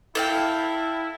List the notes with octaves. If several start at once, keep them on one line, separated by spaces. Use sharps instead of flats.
E4 A4 F5 G5